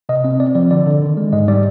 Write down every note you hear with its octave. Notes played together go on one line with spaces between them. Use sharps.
C3 D#5
C4 D#5
C4 D5
F3 D5
D3 D5
D3
D#3
G#3
G#2 D#5
G3 D5